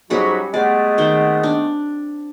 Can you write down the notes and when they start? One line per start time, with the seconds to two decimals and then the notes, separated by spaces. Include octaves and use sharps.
0.10 G#2 F#3 G3 C#4 F#4 B5
0.54 G#3 A3 B3 D5
0.98 D#3 C4 G5
1.43 D4